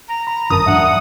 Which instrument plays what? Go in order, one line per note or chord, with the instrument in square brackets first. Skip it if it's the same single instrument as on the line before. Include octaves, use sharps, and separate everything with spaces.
[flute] A#5
[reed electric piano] B5
[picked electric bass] G1 F#2 F3 [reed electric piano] C#4 A#4 A5 [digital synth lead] D#6
[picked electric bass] E2 G#2 F#3 [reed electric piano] D4 E5 [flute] F#5